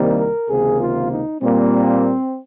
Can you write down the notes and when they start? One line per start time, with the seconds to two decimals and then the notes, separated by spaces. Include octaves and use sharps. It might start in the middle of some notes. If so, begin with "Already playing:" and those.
Already playing: C2 C3 D#3 G3 A#3
0.18 A#4
0.49 C#2 C3 D#3 A#3 G#4
0.81 F4
1.10 D#4
1.41 A#2 G3 A#3 C4